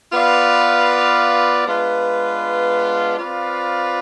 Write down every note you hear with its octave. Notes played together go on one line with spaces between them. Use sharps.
B3 F4 B4 D5 F5
G#3 B3 D4 F4 B4
C4 F4 B4 D5 F5